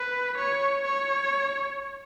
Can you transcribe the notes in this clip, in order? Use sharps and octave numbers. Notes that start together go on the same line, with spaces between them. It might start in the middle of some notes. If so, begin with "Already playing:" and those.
Already playing: B4
C#5
C#5